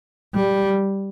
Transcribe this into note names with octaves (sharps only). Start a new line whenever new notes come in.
G3